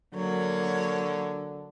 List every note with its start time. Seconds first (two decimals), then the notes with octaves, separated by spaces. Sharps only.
0.13 D3 F#3 A#3 C#5